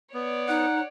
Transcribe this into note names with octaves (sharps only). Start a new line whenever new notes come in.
B3 C#5 D5
D#4 F#5